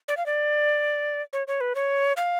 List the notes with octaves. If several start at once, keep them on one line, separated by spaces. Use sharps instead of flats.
D5
F5
D5
C#5
C#5
B4
C#5
F5